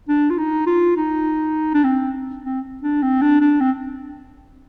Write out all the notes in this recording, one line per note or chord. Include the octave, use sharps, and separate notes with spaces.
D4
F4
D#4
F4
D#4
D4
C4
C4
D4
C4
D4
D4
C4